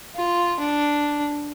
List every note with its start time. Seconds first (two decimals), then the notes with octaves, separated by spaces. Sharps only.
0.15 F4
0.59 D4